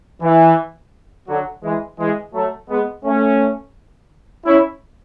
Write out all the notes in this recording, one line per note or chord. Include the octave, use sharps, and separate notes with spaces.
E3
D3 F#3
E3 G#3
E3 G#3
F#3 A3
G#3 B3
A3 C#4
C#4 E4